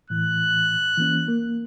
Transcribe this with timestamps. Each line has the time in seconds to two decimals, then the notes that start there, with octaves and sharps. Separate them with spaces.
0.10 A2 E3 F#6
0.98 E3 A#3 C#4
1.28 A#3